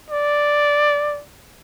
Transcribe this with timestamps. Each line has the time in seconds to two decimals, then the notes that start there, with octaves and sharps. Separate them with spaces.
0.10 D5